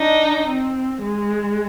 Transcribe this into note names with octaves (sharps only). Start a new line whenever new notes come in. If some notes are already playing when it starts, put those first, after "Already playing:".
Already playing: D4 D#4
C4
G#3